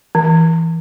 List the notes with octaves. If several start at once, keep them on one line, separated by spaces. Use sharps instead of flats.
E3